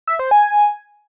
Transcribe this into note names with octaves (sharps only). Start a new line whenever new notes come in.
E5
C5
G#5